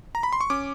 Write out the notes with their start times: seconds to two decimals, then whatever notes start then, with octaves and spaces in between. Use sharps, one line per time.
0.15 A#5
0.23 B5
0.33 C6
0.41 C#6
0.50 C#4 D6